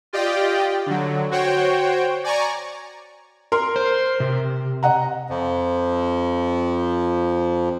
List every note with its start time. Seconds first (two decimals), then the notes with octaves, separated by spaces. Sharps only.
0.13 F4 G4 D5 D#5 G5
0.86 D3 F#3
1.31 F#4 C5 C#5 G5
2.24 D5 G#5 A#5 C#6
3.52 A#4 C6
3.76 C5
4.20 C3
4.83 D#5 F#5 A#5
5.30 F2 F3